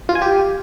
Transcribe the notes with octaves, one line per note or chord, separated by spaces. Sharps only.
F4
G#5
G4